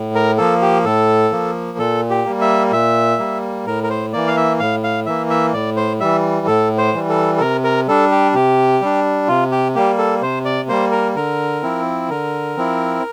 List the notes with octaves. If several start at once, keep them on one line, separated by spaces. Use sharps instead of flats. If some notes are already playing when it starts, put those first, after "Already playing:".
Already playing: A2
A#4
F3 A#3 A4
G4
A2 A4
F3 A#3
A#2 A4
G4
G3 A#3
E5
A#2 E5
G3 A#3
A2 A#4
A#4
C5
E3 A#3 D5
F5
E5
A2 F5
F5
E3 A#3 E5
E5
A2 D5
C5
E3 G3 E5
A2 A4
C5
E3 G3
A4
A4
C3 A#4
A#4
G3 D4 A4
G4
C3 G4
G3 D4
C3 F4
G4
G3 A#3 G4
A4
C3 C5
D5
G3 A#3 C5
A#4
D3 A#4
F3 C4 E4
D3 A#4
F3 C4 E4